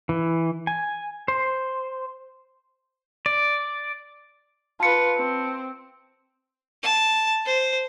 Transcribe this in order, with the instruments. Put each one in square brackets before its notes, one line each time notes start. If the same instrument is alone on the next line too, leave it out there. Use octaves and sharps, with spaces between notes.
[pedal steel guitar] E3
G#5
C5
D5
[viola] F4 B4 [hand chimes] A5 C#7
[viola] C4
[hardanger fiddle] A5
C5